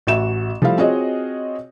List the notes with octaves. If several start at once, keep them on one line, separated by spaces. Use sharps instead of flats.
A1 F#4 E5 E7
F3 G3 A3 E4 F5
C4 F4 F#4 G#4 C#5 D#5